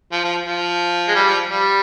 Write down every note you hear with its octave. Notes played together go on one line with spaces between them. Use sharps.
F3
F3
F3
G#3
G3
F3
G3